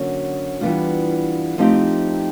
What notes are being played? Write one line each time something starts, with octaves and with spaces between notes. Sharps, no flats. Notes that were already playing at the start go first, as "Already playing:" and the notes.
Already playing: D3 F#3 A#3 C#4 F#4
E3 G3 B3 D4 F4
F3 A3 C4 D#4 G4